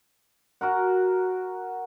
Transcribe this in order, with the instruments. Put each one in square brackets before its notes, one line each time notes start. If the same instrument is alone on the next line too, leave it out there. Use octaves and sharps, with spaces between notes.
[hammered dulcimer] F#4 A#4 F#5